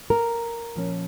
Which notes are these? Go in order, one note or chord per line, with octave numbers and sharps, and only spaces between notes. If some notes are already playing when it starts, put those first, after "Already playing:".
A#4
A#2 F3 C#4